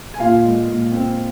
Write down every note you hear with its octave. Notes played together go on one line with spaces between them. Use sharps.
G#5
A#2 F4 F5
G#3
A#2
C4